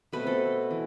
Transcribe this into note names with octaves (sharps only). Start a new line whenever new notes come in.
B2 A3 C4 B4
A4
E3